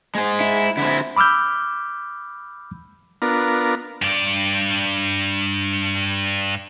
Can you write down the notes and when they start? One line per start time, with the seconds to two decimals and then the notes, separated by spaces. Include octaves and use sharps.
0.15 G#3 C5
0.41 E4
0.77 D3 C4 E4
1.17 B5 D6 E6 F6 G6
3.22 B3 D4 F4 A#4
4.02 G2 D5